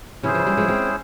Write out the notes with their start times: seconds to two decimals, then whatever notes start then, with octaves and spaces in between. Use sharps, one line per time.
0.23 C3 E3 C#4 E4 G#4 C5
0.34 C#3 F3
0.46 E3 G3
0.57 F3 G#3
0.68 G#3 C4